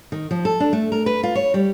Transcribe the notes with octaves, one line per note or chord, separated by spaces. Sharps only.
D#3
F3
A4
D4
A3
A#4
B4
F4
C#5
G3